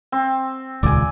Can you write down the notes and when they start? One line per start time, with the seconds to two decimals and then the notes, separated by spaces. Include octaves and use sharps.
0.12 C4
0.83 D#1 C#2 D5 G#5